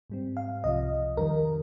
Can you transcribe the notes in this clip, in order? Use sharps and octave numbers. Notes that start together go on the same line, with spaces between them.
G#2 G3 C4
F5
C2 C3 F3 D#5
F2 D#3 G3 A#4